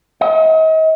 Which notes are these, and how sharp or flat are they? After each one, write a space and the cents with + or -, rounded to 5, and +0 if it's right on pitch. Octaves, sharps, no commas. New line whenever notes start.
D#5 +40